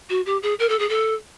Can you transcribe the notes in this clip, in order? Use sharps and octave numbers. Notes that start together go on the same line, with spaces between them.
F#4
G4
G#4
A#4
A4
G#4
A4